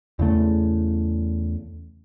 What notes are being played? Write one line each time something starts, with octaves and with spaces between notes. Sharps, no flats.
E2 C#3 A3